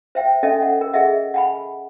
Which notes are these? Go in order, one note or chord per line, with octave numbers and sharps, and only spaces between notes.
C5 E5 G5
C#4 A4 D#5 E5 G#5
F#5
A#4
G#4 D#5 E5 F#5
F#5 G#5 B5